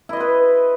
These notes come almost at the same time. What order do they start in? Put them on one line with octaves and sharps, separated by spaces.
E4 D#5 C5 B4